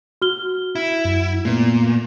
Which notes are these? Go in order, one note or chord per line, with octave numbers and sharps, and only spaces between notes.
F#4 F6 G7
E4
F#2
A#2 A3 B3